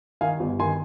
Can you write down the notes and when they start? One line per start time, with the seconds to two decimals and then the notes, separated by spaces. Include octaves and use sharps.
0.21 D#3 F5 G#5
0.40 G1
0.60 D#3 G#5 C6